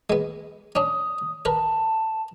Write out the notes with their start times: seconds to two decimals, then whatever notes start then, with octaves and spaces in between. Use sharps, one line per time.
0.10 G#3 B3
0.75 C#4 D4 D#6
1.45 A#4 B4 A5